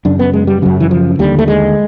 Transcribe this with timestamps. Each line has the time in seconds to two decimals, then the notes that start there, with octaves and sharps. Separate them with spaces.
0.05 F#2 C#3 D4
0.19 B3
0.33 G#3
0.47 G3
0.62 F#2 C#3 F#3
0.80 E3
0.91 F3
1.19 D#2 D3 G3
1.39 A3
1.48 G#3